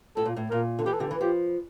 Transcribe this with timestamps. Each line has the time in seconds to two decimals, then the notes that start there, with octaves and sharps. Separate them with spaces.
0.17 A2 A4
0.26 A#2
0.37 A2
0.51 A#2 A#4
0.79 D3
0.86 E3 G4
0.94 A4
1.00 D3 G4
1.11 E3
1.21 F3 G4